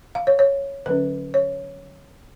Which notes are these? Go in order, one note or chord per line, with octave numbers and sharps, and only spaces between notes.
F5
C#5
C#5
D3 F#3 C#4 B4
C#5